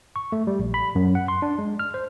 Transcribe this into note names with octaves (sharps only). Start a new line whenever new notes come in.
C#6
A3
G3
A#1
B5
F#2
F#5
C6
D4
G#3
F6
C5